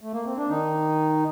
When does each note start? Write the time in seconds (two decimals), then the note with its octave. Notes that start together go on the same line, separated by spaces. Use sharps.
0.00 A3
0.13 A#3
0.25 C4
0.37 D4
0.50 D#3 D#4